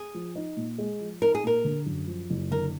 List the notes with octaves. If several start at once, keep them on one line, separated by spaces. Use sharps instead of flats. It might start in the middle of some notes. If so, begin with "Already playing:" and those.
Already playing: G#4
F3
D#4
A#2
G#3
F3
D#4 A#4
G#4
A#2 A#4
D3
F#2
F3
F#1
D3 A#4